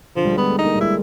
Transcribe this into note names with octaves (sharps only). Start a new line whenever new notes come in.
D3 F3
G3
G#3 B3
A3
D#4
A#3
G3
G#3 E4